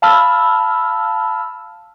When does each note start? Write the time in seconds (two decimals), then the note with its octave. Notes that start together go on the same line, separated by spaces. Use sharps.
0.02 F5 A5 B5 E6 F6